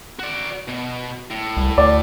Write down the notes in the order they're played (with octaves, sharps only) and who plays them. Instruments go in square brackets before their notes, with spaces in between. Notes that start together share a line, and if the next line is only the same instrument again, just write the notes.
[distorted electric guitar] F#4 D5
B2
A2
[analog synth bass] C2
[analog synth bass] D2 [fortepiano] D5